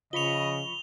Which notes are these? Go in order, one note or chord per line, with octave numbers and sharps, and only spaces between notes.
C#3 F3 D#5 B5 C#6 F7 G7